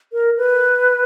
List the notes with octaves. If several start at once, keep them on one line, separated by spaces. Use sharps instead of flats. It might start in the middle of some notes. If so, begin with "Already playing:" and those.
A#4
B4